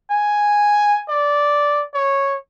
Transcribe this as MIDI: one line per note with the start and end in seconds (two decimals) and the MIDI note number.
0.10 1.01 80
1.09 1.83 74
1.94 2.35 73